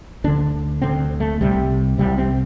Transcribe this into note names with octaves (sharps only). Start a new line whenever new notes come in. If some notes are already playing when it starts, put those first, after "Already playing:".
D2 D3 D4
D2 D3 C4
A3
C2 C3 G3
C2 C3 G3
C4